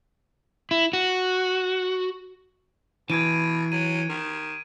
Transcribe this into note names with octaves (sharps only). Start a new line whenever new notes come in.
E4
F#4
B2 E3 G#6 D7 D#7
F#3 D#7
D#3